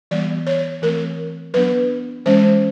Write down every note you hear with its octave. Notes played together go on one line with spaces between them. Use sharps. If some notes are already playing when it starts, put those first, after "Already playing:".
E3 G3 B3 D5
C#5
E3 A3 C4 A#4
F#3 B3 D4 B4
E3 G#3 C#4 C5